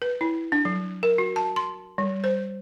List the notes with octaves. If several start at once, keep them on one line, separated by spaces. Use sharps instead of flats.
B4
E4
D4
F#3
A#4
F#4
A5
C6
G3
C5